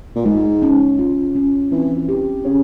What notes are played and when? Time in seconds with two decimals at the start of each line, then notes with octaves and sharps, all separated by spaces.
0.16 A#2
0.25 G#2 G#3
0.62 C#4
0.99 F4
1.35 C#4
1.72 E3 C4
2.09 G4
2.45 C#3 C#5